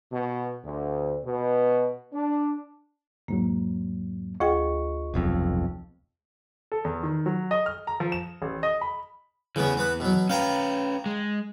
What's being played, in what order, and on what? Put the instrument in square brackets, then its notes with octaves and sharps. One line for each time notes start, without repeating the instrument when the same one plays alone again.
[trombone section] B2
D2
B2
D4
[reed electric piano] E2 G#2 F#3 [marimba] A#3
[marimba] D2 G#4 G5 [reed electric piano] F4 D#5 C#6
[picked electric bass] F1 B1 F2
[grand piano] A4
E2
D#3
F#3
D#5
F6
A#5
F3
E7
A1
D#5
B5
[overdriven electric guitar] E2 E3 [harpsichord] C#3 B3 C#4
[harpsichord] B3 B4
B2 F#3
[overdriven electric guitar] C#4 B4 [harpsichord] F5 G5 A#5
[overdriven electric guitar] G#3